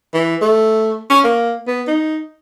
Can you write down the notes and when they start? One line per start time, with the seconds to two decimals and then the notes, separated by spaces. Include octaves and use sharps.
0.14 E3
0.42 A3
1.10 C#4
1.24 A#3
1.67 B3
1.87 D#4